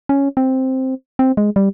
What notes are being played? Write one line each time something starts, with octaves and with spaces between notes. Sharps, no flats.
C#4
C4
C4
G#3
G3